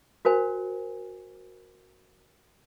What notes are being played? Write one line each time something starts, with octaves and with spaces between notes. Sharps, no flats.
F#4 A#4 C5 G#5